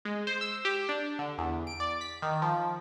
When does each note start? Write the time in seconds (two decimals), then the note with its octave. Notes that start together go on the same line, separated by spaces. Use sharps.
0.05 G#3
0.27 C5
0.41 E6
0.65 G4
0.89 D4
1.19 D3
1.38 E2
1.67 D7
1.80 D5
2.01 B6
2.22 D#3
2.42 F3